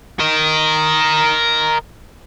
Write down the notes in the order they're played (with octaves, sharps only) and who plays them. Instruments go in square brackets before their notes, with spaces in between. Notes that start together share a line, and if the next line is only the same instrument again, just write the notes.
[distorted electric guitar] A#4 D#5